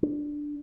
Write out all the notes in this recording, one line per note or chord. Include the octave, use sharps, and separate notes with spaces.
D4